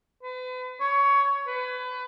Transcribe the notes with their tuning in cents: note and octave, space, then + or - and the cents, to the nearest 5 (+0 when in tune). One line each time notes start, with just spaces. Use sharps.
B4 +40
C#5 +15
B4 +30